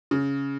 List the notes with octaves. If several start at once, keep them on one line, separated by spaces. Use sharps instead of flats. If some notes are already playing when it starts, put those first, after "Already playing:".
C#3